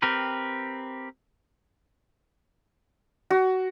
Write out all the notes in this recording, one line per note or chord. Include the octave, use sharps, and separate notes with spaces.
C4 G4 A#4 B4
F#4